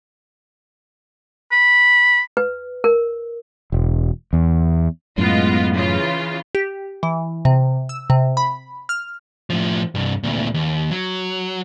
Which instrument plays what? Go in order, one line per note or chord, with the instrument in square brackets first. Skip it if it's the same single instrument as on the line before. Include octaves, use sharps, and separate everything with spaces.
[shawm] B5
[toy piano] B4
A#4
[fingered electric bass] E1
E2
[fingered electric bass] F#2 A2 [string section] G#3 B3 F4
[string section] C#3 E3 F4
[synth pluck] G4
E3
C3
E6
C3
B5
F6
[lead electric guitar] A2 F3
C2 G2
D2 A#2
D#2
F#3